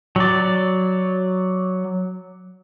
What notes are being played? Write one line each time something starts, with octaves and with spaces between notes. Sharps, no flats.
F#3 D5